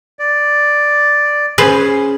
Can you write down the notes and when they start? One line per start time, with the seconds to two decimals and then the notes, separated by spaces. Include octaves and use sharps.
0.19 D5
1.58 C#4 G#4 B4 C5